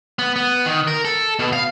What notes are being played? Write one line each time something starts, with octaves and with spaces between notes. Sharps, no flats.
B3
B3
D#3
A#4
A4
B2
F5